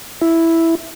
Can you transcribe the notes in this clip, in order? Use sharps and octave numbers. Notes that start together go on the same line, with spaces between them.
E4